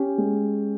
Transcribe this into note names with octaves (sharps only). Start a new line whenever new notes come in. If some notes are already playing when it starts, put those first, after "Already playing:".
Already playing: C#4 G4
G#3